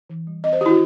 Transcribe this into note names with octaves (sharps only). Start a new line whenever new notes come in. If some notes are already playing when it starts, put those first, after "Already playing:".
E3
G3
C4 D#5
C5
D#3 E4 G4
F#4